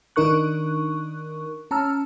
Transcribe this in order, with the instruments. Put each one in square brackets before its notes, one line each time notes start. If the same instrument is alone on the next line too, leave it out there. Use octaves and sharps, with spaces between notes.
[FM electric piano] D#3 D4 D#4 A#4 C#6 F#6
C#4 A5 A#5 E6 F6